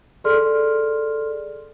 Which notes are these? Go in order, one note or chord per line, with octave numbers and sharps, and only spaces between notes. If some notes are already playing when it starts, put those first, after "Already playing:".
G#4 A4 D5 C6 F6